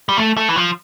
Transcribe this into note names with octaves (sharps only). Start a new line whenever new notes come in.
G3
A3
A3
E3
F3